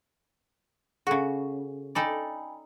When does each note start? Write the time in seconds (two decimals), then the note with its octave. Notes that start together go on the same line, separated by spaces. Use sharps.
1.07 C#3 F#4 G#4 A4
1.95 D#4 A4 D5 G5 G#5 B5